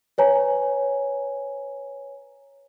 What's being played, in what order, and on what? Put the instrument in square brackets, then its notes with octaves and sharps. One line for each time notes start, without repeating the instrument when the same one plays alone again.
[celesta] B4 C#5 G#5 A#5